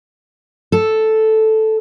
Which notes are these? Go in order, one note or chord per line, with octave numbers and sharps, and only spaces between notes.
A4